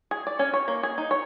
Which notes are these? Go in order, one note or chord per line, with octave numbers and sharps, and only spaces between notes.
G#4
D5
C#4
C#5
A#3
G#4
D#4
C#5